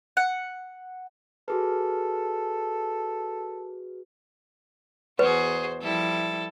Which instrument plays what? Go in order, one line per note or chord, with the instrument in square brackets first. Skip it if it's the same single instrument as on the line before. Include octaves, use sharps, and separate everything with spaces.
[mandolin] F#5
[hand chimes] F#4 G#4 B4 [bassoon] A4
[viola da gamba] E2 C5 [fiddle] F#4 G#4 [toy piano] B4
[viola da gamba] F3 G3 E4 [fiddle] A4